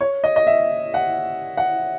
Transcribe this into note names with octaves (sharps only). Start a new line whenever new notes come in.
C#5
D#5
D#5
E5
F#5
F#5